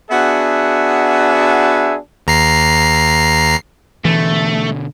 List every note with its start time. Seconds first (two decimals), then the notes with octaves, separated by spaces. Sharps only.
0.11 B3 D4 F#4 G#4 E5
2.27 D#2 A#5 C7
4.05 B2 D3 E3 A3